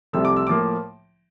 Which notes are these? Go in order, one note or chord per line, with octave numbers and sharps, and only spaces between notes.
C2 C3 F3 A3 C4 E6
D6
E6
A2 F3 A#3 D6